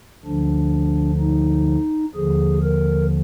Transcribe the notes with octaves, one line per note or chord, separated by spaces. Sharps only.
D2 D3 F3 D4
D#4
D#2 D3 F3 G#4
A#4